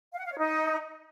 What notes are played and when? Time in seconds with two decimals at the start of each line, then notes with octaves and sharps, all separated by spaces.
0.11 F5
0.18 F#5
0.25 F5
0.31 C#5
0.38 D#4